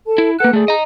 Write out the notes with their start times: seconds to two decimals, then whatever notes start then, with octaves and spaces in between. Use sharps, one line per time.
0.06 A4 A5
0.18 E4
0.40 A#3 A4 B4 F#5 F#6
0.53 A3 G#4 D5
0.68 D#5 A#5